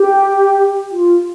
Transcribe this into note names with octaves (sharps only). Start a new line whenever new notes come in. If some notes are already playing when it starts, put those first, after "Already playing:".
Already playing: G4
F4